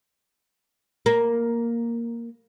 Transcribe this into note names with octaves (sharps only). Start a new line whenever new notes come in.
A#3